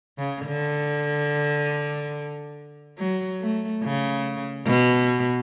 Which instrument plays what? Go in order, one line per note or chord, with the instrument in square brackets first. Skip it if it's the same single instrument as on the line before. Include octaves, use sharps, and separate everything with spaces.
[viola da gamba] C#3
D3
F#3
A3
C#3
B2